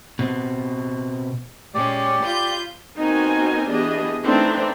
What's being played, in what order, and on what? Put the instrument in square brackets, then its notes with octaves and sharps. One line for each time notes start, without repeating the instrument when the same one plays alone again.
[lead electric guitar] B2 C4
[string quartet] A#2 G#3 C#4 [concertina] G4 D5
[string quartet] F4 B4 G6
[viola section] B3 C4 D#4 F#4 A#4 G#5
E3 B3 D4 G4 G#4 D#5
E3 A3 C4 D4 D#4